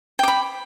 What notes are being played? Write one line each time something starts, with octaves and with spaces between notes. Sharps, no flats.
G5 B5 D6